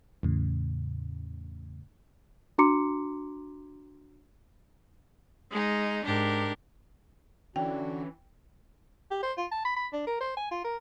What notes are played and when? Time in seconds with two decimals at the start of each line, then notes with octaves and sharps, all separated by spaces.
0.23 E2 A2 C#3
2.58 D4 F#4 A#5 C6 D6 C#7
5.51 G#3 D#4
6.03 G#2 D4 G4 A#4
7.56 D3 E3 C#4 D4 F#4 G5
9.11 G4
9.23 C5
9.38 F4
9.52 A5
9.65 B5
9.77 B5
9.93 D4
10.07 A#4
10.21 C5
10.37 G#5
10.51 F4
10.64 A#4